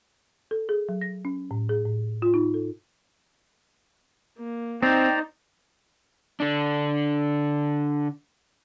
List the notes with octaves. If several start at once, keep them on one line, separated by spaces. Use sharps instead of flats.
A4
G#4
F#3
A#6
C#4
A2
G#4
A2
F4
D#4
A4
A#3
C4 D#4 C5 D5 G5 A#5
D3 D4